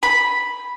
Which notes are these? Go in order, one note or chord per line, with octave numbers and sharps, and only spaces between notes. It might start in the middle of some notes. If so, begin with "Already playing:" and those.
B5